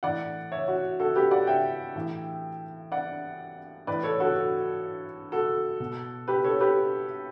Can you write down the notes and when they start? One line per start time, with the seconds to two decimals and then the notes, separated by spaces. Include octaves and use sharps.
0.03 A2 E3 D5 F#5
0.52 C#5 E5
0.68 F#4
0.99 F#4 A4
1.15 G4 B4
1.31 D5 F#5
1.47 E5 G5
1.95 A2 E3
2.92 D5 F#5
3.87 A2 E3 B4 D5
4.03 A4 C#5
4.20 F#4 A4
4.36 F#4
5.32 F#4 A4
5.80 B2
6.28 G4 B4
6.44 A4 C#5
6.60 G4 B4